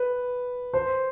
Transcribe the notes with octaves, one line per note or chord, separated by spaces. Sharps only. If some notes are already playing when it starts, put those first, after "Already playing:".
Already playing: B4
C5